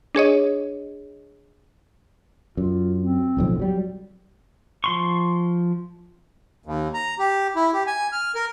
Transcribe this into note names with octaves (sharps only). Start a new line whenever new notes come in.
D4 G#4 C#5 D#5
F#2 F4
C4
D1 B1 F2
F#3 G3
F3 C6 C#6
D#2
A#5
G4
E4
G4
G#5
F6
A#4